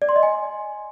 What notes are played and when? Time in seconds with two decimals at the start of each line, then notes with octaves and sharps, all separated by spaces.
0.02 D5
0.09 C6
0.16 D#5
0.23 G#5